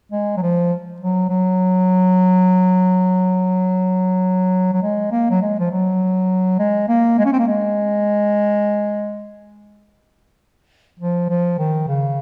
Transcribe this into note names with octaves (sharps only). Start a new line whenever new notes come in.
G#3
F#3
F3
F#3
F#3
F#3
G#3
A#3
F#3
G#3
F3
F#3
G#3
A#3
G#3
C#4
C4
A#3
G#3
F3
F3
D#3
C#3